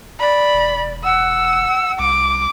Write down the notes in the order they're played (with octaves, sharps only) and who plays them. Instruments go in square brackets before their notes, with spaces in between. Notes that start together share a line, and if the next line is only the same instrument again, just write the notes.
[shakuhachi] D5 [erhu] B5
[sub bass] E1
[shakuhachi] F#5 [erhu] E6
[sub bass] C2 [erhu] D6